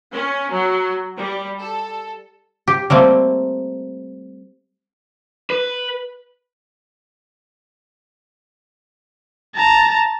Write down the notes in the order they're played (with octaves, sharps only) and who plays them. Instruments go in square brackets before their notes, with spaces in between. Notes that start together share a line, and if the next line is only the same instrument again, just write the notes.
[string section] C#4
F#3
G3
A4
[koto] G4
G3 A3 A#3 C4
[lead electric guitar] B4
[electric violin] A5 A#5